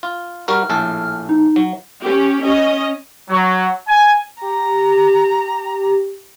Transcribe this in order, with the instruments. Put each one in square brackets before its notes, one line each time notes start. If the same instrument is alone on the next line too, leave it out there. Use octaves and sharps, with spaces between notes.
[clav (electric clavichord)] F4
[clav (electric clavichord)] G3 F#4 A#4 [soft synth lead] F6
[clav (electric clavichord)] A#1 A2 A4
[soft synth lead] D#4
[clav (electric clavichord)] F#3
[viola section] C#4 G4
C#4 D#5
[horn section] F#3
G#5
[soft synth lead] G4 [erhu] A#5